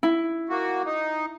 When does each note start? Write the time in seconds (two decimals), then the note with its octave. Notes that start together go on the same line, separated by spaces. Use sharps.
0.03 E4
0.49 A#3 F#4
0.85 D#4